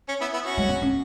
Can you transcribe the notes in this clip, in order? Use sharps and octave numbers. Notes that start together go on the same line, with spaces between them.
C#4
B3 E4
B3 E4
C#4 F#4
G#3
B3
C#4